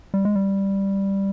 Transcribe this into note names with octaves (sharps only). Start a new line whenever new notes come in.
G3
G#3
G3